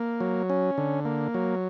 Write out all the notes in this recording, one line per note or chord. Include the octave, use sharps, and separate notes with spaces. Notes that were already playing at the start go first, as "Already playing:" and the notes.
Already playing: A#3
F#3
C#4
D3
A#3
F#3